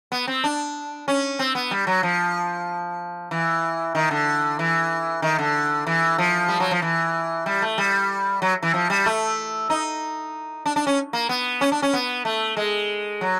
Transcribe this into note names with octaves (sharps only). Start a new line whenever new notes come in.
B3
C4
D4
C#4
C4
B3
G3
F#3
F3
E3
D#3
D3
E3
D#3
D3
E3
F3
G3
F#3
F3
E3
G3
A3
G3
F#3
E3
F3
G3
A3
D#4
D4
D4
C#4
A#3
B3
C#4
D4
C#4
B3
A3
G#3
F#3